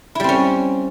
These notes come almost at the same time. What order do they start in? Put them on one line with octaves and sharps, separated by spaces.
E4 G3 C4 C#4